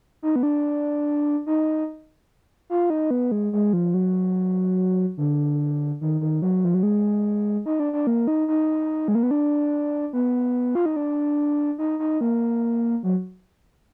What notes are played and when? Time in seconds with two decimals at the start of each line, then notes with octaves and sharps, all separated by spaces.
0.23 D#4
0.36 B3
0.43 D4
1.46 D#4
2.70 F4
2.90 D#4
3.11 B3
3.32 G#3
3.53 G#3
3.73 F3
3.94 F#3
5.17 D3
6.01 D#3
6.21 D#3
6.42 F#3
6.65 F3
6.74 F#3
6.83 G#3
7.66 D#4
7.80 D4
7.93 D4
8.07 A#3
8.28 D#4
8.48 D#4
9.08 G#3
9.15 A#3
9.23 B3
9.31 D4
10.13 B3
10.75 F4
10.86 D#4
10.96 D4
11.78 D#4
11.99 D#4
12.21 A#3
13.03 F#3